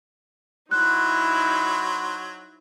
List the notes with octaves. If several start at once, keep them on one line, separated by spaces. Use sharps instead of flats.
F#3 D#4 E4 C5 F#6